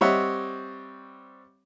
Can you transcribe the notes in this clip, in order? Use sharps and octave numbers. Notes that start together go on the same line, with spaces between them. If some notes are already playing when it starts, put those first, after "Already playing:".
G3 C4 C#5 D#5 E5 F#5